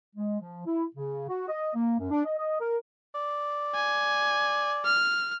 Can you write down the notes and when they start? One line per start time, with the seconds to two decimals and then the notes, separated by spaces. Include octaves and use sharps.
0.16 G#3
0.40 F3
0.66 E4
0.94 C#3
1.29 F#4
1.48 D#5
1.75 A#3
1.99 F#2
2.11 D4
2.25 D#5
2.38 D#5
2.60 A#4
3.15 D5
3.75 G#5
4.85 F6